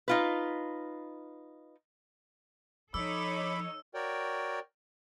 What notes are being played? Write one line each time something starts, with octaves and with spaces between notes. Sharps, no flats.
D#4 F4 B4
F3 D#4 A4 C#5 B5 D6 E6
F#4 A#4 C#5 D5 G5